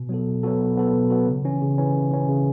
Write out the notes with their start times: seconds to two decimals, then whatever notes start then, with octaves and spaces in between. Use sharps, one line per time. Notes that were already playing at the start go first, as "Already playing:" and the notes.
Already playing: B2
0.09 F#3 B3 F#4 A4
0.27 B2
0.43 F#3 B3 F#4 A4
0.59 B2
0.77 F#3 B3 F#4 A4
0.93 B2
1.10 F#3 B3 F#4 A4
1.27 C#3
1.45 E3 C#4
1.62 C#3
1.78 E3 C#4
1.95 C#3
2.11 E3 C#4
2.29 C#3